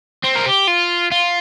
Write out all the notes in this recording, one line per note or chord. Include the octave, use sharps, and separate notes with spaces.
C4
A#4
G4
F4
F4